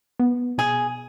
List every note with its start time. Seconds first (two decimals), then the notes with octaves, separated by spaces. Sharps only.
0.20 B3
0.58 B2 G#4